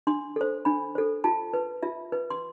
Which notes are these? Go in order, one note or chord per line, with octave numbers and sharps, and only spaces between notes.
D4 C6
A4 C5
D4 B5
A4 C5
F4 A5
B4
F4 E5
B4
C6